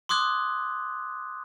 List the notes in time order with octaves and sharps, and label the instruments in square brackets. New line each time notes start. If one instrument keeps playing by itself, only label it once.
[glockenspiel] C6 D6 D#6 F#6 G#6